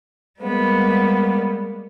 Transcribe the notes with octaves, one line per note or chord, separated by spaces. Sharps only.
G3 G#3 A#3 B3